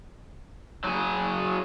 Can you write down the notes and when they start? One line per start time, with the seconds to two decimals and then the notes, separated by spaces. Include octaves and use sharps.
0.84 F#3 G#4